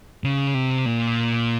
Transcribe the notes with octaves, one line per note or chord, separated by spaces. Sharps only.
C#3
C3
A#2